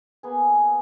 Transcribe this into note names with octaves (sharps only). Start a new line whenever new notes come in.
A#3 B3 G#4 G#5